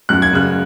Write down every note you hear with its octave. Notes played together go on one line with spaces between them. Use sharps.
F#2 F#6
G#6
C#3 F#6